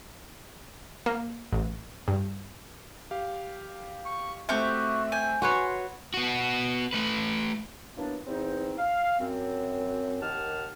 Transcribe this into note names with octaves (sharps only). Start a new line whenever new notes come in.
A#3
A1
G2
G4 F5
C#6
A3 C4 F#4 G4 E5 C#6 G6
G5 G#5
F#4 B4 C#5 C6
B3 F#4
A3 B4
E3 F#3 A#3 B3 D4
E2 C4 D#4
F5
F#2 C4
D#2 D#3 G4 F#5 A5 F6